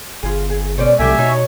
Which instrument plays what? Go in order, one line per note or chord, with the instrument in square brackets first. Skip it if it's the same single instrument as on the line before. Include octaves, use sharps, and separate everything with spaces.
[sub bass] G1 [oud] F4 G#4
[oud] G#4
[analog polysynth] B2 G#3 [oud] C#4 C5 D5
[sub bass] C2 [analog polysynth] C3 A3 [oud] F#3 G4 [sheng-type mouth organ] E5 G#5
[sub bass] B2 [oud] D#4 [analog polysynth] C#5